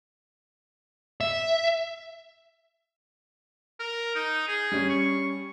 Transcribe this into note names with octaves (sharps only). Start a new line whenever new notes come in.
E5
A#4
D#4
G#4
G3 C#4
C#6